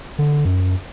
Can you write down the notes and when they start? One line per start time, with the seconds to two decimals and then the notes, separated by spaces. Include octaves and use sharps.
0.19 D3
0.45 F#2